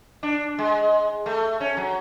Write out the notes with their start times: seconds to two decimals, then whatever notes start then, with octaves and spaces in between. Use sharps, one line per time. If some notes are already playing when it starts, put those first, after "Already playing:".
0.23 D4
0.58 G#3
1.26 A3
1.60 C#4
1.77 F#3